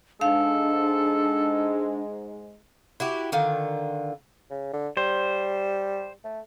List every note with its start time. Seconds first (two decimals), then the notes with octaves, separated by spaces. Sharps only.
0.21 G#2 G#3 D4 A4 F5
3.00 E4 F#4 G4
3.32 D3 D#3 F4
4.50 C#3
4.73 D3
4.97 G3 C5
6.24 A3